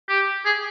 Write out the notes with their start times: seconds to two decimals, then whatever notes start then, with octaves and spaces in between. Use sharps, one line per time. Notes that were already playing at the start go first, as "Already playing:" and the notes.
0.09 G4
0.45 G#4